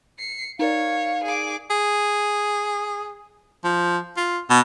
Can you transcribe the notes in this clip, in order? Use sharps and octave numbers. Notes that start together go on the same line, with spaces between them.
C7 C#7
D#4 A#4 C#5 D5 F5
G#4 D6
G#4
F3
F4
B2